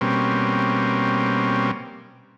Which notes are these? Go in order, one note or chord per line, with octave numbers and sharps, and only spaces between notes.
B2 G3 A#3 C4 C#4